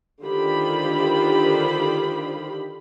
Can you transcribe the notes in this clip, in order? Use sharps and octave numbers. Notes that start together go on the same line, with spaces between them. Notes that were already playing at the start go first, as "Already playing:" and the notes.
D3 D#3 F4 G4 C5 B5